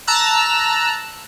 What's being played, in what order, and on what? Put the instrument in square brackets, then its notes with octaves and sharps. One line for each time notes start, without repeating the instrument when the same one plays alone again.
[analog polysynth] A5 A#5 E6 F#6